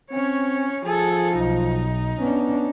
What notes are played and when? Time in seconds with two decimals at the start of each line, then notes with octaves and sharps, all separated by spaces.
0.11 C4 C#4 C#5
0.85 F3 G#4 A4
1.35 B1 D#4
2.20 B3 C#4 D4